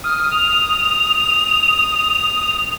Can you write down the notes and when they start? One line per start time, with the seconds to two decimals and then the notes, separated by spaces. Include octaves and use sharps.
0.04 D#6 F6
0.31 F7